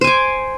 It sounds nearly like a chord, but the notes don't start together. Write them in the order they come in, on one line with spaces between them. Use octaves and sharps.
C5 G#5 D6